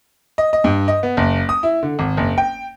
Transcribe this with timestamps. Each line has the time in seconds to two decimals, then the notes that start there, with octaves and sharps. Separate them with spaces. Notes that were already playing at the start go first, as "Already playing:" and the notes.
0.38 D#5
0.53 D#5
0.64 G2
0.88 D#5
1.03 B3
1.17 F#1
1.49 D#6
1.63 E4
1.83 D3
1.99 G#1
2.17 F#1
2.38 G5